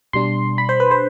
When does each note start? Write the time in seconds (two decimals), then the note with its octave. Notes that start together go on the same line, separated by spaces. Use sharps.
0.13 B2 G3 D4 C6
0.58 B5
0.69 C5
0.80 B4
0.91 C5